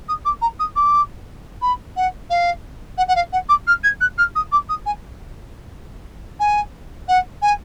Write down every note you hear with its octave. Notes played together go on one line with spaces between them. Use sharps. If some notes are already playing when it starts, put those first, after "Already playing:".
D#6
D6
A#5
D#6
D6
B5
F#5
F5
F#5
F#5
F5
F#5
D6
F6
G#6
F#6
F6
D#6
D6
D#6
G#5
G#5
F#5
G#5